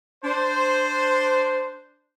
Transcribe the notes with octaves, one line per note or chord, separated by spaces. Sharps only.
D4 C5